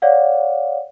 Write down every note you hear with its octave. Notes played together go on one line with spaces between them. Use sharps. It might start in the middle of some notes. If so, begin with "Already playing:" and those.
C#5 D5 F5 F#5